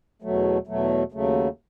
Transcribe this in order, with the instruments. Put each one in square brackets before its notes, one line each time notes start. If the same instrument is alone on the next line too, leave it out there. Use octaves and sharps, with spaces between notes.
[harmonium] E2 B2 F#3 A3
E2 B2 F#3 A3
D#2 C#3 F#3 A3